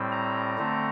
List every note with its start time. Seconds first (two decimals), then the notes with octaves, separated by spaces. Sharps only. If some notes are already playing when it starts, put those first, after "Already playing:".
Already playing: A2 G3 C4
0.12 A#5
0.58 D3 A3 C4